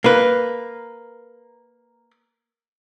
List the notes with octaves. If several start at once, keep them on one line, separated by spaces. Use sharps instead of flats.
A#3 B4